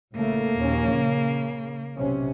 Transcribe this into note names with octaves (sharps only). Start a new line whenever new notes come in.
A1 C#3 A3 A#3
A#1 D#2 C#4
C#3
B1 C3 C#4